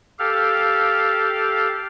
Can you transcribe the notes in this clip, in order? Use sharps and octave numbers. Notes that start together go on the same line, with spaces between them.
G4 A4 F5